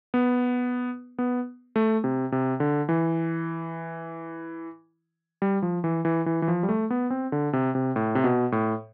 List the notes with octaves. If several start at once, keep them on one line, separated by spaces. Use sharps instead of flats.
B3
B3
A3
C3
C3
D3
E3
G3
F3
E3
E3
E3
E3
F3
G3
A3
B3
C4
D3
C3
C3
A2
C3
B2
A2